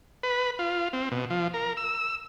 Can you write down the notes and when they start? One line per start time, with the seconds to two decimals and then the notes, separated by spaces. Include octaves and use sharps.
0.23 B4
0.59 F4
0.93 C4
1.12 B2
1.30 F3
1.54 A#4
1.77 E6